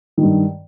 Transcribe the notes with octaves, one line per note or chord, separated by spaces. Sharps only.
G2 D#3